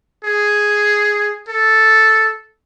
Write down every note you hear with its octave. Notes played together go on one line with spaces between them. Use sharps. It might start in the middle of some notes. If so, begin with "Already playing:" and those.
G#4
A4